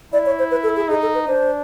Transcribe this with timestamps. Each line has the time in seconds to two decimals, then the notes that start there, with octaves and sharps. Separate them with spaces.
0.13 E4 D5
0.26 C#5
0.39 C5
0.51 B4
0.63 A4
0.76 G#4
0.89 D#4 G#4
1.02 A4
1.15 B4
1.27 D4 C5